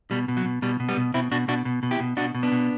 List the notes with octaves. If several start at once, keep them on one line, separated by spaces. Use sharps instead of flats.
B2 G3
B2
F#3
B2
B2 G3
B2
G3 B3
B2
B2 C4 E4
B2 D4 F#4
B2 D4 F#4
B2
B2
E4 G4
B2
B2 D4 F#4
B2
B3 D4
B2